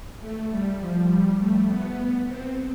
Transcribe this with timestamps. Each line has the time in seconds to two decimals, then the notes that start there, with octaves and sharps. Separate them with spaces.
0.20 A3
0.50 G3
0.80 F3
1.09 G3
1.39 A3
1.68 B3
2.28 C4